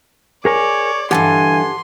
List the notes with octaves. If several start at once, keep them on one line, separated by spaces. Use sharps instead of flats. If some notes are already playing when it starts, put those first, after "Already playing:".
G#4 A#4 C#5 D5 G#5
G2 D3 E3 G4 F#5 G#5 A5 C6